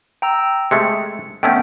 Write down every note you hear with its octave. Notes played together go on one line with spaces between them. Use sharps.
G5 A#5 E6
C3 G#3 A3 C#7
D#3 A3 B3 C#4 G5